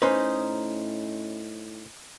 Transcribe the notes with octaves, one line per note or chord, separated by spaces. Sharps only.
A2 C#4 D#4 B4 C5